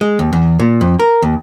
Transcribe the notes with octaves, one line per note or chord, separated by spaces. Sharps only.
G#3
D#2
E2
A#2
F2
A#4
D#2